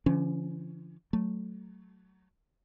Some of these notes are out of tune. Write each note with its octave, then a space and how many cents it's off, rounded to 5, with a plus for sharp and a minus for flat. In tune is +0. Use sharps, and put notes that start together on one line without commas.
D3 -25 F3 -45 C#4 +0
F#3 +15 A3 +0